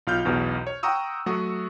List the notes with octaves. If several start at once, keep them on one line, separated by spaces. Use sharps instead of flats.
B1 F4 F6 G6
B1 E2 B2
C#5
F#5 G5 A#5 C#6 D#6 E6
F#3 A3 F#4 C#6 D#6